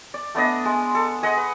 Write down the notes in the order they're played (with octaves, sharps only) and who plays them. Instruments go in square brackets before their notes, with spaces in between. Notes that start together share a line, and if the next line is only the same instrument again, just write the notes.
[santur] D5
A3 B3 D4 D#5
G#3
A4
G#4 D#5 F#5 C6
B4